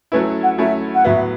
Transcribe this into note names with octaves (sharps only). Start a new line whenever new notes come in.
F#3 A3 C#4 E4 B4
F#5
F#3 A3 C#4 E4 E5
F#5
A2 F#3 B3 E5